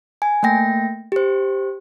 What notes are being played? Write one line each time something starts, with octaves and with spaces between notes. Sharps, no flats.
G#5
A3 A#3 G5 A#6
G4 C5